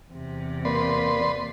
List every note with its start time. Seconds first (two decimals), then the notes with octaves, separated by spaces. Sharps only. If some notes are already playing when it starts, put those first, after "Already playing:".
0.11 E2 C3
0.65 A#3 B4 D5 C6